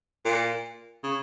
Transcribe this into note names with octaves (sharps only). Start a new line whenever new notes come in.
A#2
C#3